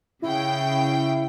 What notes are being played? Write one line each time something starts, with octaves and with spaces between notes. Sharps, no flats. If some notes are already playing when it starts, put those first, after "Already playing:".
C#3 E4 G5